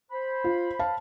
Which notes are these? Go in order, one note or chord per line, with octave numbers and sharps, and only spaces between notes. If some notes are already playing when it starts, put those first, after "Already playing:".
C5 B5
F4
F5 A5